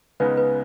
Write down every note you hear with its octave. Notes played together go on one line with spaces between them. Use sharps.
C#2 C#3 G#3 B3 D#4 B4
B4